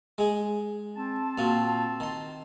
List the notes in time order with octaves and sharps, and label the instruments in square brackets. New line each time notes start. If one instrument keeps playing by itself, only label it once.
[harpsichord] G#3 G#4
[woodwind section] C4 A5
[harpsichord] A#2 F4 F#4
D#3 C6